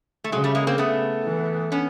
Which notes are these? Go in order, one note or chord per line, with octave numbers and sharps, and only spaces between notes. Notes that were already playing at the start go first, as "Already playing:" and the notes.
A3
C#3 F#3 G#3
G3 A3
G#3 A#3
A#3 C4
A3 B3
E3
B3 C#4